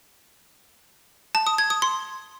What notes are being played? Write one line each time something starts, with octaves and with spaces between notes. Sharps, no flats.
A5
D#6
G#6
D#6
C6